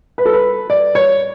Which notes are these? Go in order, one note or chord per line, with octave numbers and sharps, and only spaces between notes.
B4
A4
B4
D5
C#5